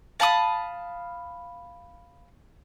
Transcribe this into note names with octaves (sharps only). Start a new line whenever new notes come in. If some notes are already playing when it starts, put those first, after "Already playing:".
F5 A5 B5 D#6